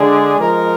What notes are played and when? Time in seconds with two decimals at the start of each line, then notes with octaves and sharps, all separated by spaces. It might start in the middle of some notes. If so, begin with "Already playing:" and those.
Already playing: D3 G#3 D4 G#4
0.38 F3 G#3 D#4 A#4